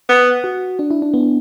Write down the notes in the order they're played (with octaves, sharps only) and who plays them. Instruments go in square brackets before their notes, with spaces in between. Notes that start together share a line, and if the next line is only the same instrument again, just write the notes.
[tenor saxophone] B3
[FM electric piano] F#4
D4
E4
D4
B3